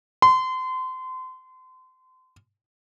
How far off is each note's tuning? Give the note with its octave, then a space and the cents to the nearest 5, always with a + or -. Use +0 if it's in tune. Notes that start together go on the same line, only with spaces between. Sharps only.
C6 -30